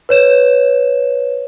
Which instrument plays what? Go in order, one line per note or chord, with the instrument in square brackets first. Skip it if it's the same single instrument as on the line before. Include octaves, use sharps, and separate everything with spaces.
[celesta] B4 C#5 E7